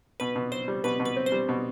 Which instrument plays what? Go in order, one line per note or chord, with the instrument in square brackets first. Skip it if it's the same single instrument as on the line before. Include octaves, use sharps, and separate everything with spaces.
[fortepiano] B2 [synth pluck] B4
[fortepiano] B2
[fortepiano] C4 [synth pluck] C5
[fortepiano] G3
[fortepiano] B2 [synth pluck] B4
[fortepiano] B2
[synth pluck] B4
[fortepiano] C4
[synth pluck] C5
[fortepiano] G3
B2